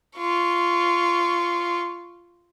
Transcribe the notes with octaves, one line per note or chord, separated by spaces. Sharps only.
F4 C#6